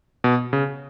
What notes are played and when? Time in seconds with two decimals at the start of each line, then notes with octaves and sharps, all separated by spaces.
0.24 B2
0.53 C#3